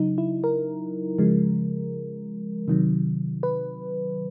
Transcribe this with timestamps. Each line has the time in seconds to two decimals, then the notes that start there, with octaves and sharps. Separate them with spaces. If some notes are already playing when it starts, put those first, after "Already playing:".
Already playing: C#3 F#3 D#4
0.18 E4
0.44 A#4
1.18 C#3 F3 G#3
2.68 C3 D#3 F#3
3.43 B4